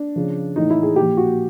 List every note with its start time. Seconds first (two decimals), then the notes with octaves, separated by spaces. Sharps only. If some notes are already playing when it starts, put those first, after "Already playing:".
Already playing: D4
0.16 C#3 F3
0.56 A2 E3 D#4
0.70 E4
0.83 G#4
0.96 A#2 G4
1.02 F3
1.17 F#4